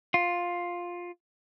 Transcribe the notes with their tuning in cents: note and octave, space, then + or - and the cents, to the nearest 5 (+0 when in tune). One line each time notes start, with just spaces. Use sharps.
F4 +10